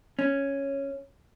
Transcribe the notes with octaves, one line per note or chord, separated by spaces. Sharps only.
C#4